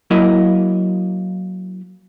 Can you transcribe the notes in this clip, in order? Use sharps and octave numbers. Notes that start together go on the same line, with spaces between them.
F#3 A#3 E4 A#4 D#5